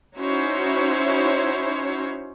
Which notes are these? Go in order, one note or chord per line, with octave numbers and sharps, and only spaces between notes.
C#4 D#4 E4 F#4 C5 C#5